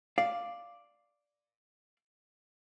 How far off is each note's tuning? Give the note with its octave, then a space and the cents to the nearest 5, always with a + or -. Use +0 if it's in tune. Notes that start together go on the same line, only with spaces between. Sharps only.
D5 +0 F5 +0